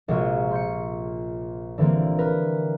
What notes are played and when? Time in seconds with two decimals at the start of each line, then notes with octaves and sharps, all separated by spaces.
0.08 A#1 C3 G#3 F4 F#4
0.51 C6 G6 C#7
1.78 D3 E3 G3 A#3 C4
2.19 A#4 B4